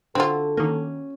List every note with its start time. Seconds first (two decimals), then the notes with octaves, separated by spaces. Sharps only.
0.15 D3 C4 F4 F#4 A4
0.57 D#3 A#3 C#4